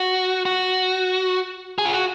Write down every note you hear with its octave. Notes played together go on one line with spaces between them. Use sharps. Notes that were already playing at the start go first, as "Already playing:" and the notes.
Already playing: F#4
F#4
G#4
F4
F#4